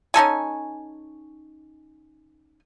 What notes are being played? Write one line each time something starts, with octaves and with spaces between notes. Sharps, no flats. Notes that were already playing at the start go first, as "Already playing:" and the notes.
C#4 D#4 A4 G#5